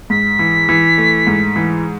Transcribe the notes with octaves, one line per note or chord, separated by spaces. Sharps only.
G#2 B6
E3
E3
A3
G#2
E3